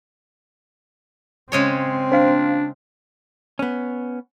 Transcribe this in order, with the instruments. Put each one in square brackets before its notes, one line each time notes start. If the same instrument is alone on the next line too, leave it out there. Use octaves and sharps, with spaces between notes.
[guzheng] C#3 G#3 C#5 [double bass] C4
[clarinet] D4 [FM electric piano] C5 F5
[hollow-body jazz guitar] B3 C#4